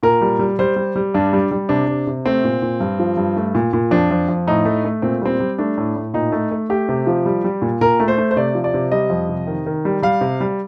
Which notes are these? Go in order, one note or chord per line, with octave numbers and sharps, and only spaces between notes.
A#2 A#4
G3
G3
G3 C5
G3
G3
G2 D4
G3
G3
C3 D4
C3
C3
A3 C4
A#2
A#2
G2
F3
G2
A3
A#2
A#2
F2 D4
F2
F2
A2 D#4
A3
A3
A#2 C4
G3 C4
G3
A3 D4
A2
A2
A#2 D#4
A3
A3
A3 G4
C3
F3
G3
G3
A#2
A#2 A#4
A3
C5
A3
C5
C3 D5
F3
D5
C3
G3 D#5
F2
C3
D#3
D#3
G3
G3 F5
C3
G3